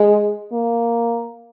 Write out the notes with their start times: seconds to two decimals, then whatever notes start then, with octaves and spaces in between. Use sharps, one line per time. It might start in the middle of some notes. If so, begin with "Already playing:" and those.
Already playing: G#3
0.53 A#3